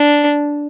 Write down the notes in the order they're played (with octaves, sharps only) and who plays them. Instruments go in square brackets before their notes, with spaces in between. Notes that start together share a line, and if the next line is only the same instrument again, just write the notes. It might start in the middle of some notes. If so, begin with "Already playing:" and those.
Already playing: [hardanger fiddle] D4